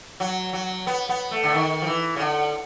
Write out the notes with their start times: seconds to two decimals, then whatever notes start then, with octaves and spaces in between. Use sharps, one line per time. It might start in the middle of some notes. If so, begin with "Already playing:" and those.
0.20 F#3
0.53 F#3
0.87 B3
1.09 B3
1.31 A3
1.43 D3
1.54 D#3
1.82 F3
1.87 E3
2.16 C#3
2.20 D3